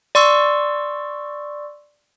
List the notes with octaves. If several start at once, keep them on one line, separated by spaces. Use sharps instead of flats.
D5 C6 C#6 E6